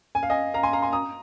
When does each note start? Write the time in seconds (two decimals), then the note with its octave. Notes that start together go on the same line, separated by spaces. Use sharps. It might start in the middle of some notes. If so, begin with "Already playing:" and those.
0.15 G#5
0.23 F5
0.30 D#5 G#5
0.54 F5 A#5
0.63 G#5 C6
0.73 F5 A#5
0.82 G#5 C6
0.92 A#5 D#6